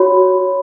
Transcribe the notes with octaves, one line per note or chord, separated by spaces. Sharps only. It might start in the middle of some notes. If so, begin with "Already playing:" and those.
Already playing: F#4 C#5 B5